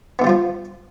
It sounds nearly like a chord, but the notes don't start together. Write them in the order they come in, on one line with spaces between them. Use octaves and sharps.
B3 D3 G3 F4 F3